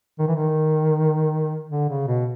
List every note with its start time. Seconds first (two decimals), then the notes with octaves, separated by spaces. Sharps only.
0.19 D#3
0.27 E3
0.35 D#3
1.69 D3
1.89 C#3
2.07 B2